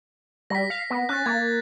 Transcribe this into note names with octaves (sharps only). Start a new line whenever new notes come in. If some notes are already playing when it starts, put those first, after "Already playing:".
G3 A#6 B6
F5
B3
C#4 F#6 A6
A#3 G#6 A6